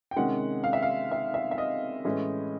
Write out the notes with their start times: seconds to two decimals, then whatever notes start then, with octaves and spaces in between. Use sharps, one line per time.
0.11 G5
0.16 C3 D#3 G#3 C#4 F#5
0.64 F5
0.73 E5
0.83 F5
1.11 E5
1.34 E5
1.51 E5
1.58 D#5
2.05 A2 E3 G#3 C#4